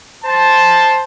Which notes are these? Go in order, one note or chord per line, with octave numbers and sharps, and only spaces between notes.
C5 A5